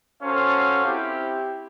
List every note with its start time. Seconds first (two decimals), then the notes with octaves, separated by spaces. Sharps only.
0.22 C#4 F#4 A4 C5 F5
0.84 C4 E4 G4